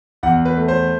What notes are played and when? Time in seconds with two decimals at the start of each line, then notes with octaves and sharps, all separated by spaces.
0.23 E2 F#5
0.45 B4
0.57 A3
0.68 C5